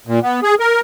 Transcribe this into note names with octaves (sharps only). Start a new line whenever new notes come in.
A#2
B3
G#4
A#4